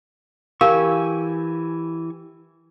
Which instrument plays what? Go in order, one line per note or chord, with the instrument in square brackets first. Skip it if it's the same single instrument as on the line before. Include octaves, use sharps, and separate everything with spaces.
[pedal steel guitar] E3 G#5 C#6 [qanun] G4 [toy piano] A#4 [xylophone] F5